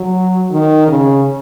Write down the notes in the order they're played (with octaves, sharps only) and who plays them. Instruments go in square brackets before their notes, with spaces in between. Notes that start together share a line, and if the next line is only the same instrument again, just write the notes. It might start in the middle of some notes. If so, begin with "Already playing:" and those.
Already playing: [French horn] F#3
D#3
C#3